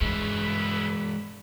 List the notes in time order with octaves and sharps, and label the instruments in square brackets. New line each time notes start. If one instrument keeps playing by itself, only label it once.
[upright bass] G2 [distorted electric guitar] C#3 E4 [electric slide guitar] E3 G#3 [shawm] B4